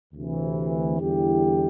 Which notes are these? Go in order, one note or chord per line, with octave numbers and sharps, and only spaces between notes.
D2 C3 E3
E2 D3 G3 E4 G4